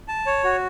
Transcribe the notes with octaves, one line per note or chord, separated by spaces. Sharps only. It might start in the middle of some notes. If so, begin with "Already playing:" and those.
A5
C#5
F#4